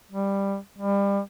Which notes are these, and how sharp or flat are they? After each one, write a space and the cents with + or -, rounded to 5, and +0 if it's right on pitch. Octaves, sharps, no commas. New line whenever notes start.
G3 +10
G3 +30